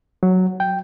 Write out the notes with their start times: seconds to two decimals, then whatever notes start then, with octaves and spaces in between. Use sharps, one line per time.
0.23 F#3
0.60 G5